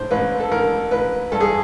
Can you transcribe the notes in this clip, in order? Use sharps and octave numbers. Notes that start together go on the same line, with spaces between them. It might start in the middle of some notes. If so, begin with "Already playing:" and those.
Already playing: A2 C5
A1 B4
A4
A1 A#4
A1 B4
G2 A4
G#4